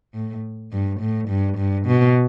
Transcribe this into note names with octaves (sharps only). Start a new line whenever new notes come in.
A2
G2
A2
G2
G2
B2